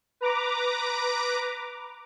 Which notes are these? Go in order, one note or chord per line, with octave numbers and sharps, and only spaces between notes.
B4 A#5 D6